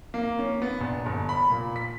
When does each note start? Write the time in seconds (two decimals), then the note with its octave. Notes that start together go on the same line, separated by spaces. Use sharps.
0.14 A#3
0.39 C#4
0.62 B3
0.81 A#1
1.06 G1
1.29 B5
1.50 A#2
1.76 B6